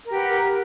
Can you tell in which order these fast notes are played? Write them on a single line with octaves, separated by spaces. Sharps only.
A#4 G4 B4 F#5